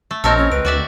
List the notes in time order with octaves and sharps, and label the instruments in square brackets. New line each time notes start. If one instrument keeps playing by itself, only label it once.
[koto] A3
[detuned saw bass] A#1 [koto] C4 A#4 C#5 [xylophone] D#5 E6 [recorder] A5
[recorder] C#4
[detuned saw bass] C#2 [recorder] B4 [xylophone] D7
[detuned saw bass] D2 [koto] F#4 D5 E5